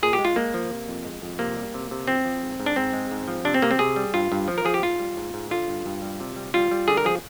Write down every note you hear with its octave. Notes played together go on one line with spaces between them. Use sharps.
A#2 G#4
G4
G#3
F4
G#3 A#3
F3
C3
F2
G#3
F2
C3 A#3
G3
C3
C3
F3 C4
F3
G#2
G#2
D4
G#2 C4
G#3
G#2
F3
C3 D4
C4
C3 A#3
C4
C3 G#4
G3
G2 F4
G2
F3
A#4
F3 G#4
G4
G#2 F4
G3
G#2
G#2
D3 F4
G2
G2
G3
C3
G3
G3 F4
G3
D3 G#4
A#4
F3 G#4